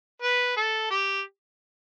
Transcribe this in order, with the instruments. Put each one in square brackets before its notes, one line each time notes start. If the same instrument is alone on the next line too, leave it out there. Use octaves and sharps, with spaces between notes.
[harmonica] B4
A4
G4